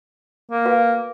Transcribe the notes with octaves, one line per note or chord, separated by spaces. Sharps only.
A#3
F#4 B4 F5